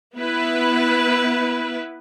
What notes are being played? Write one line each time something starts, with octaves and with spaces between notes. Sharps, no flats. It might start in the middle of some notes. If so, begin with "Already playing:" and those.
B3 E4 B4